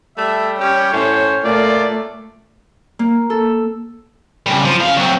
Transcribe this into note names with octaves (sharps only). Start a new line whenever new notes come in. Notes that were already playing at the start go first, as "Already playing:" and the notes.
G3 A3 E5
C#4 G4 C#5
A2 C#4 C5
A#2 A3 F4 D5
A#3
A4
C#3 G3
F3
C#3 F5
F#3 C4